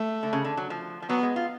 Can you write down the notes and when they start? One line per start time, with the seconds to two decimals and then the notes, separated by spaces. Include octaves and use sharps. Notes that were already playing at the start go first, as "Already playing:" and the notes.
Already playing: A3
0.23 D3
0.33 C#3
0.45 D3
0.57 F#3
0.70 F3
1.02 F3
1.09 F#3 B3
1.23 G#3
1.36 F4